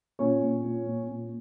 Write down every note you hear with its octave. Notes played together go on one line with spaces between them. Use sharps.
A#2 C#4 C#5
A#2
A#2
A#2
A#2